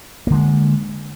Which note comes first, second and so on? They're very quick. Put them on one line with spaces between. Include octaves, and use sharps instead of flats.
A#3 D3 G#3